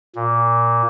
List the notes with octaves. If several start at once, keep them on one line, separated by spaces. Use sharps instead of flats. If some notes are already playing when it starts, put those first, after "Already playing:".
A#2